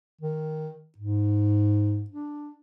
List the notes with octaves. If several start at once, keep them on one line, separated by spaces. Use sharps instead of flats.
D#3
G#2
D4